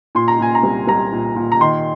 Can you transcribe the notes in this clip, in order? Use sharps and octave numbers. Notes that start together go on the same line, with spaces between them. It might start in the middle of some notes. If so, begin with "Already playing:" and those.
A#2 C6
A#5
A#2 G#5
A#5
C2
C2 A#5
A#2
A#2
A#5
D#3 C6